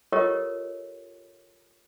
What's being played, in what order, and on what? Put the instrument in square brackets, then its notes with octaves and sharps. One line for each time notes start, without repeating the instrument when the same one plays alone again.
[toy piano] F4 G4 A4 A#4 C#5 D#5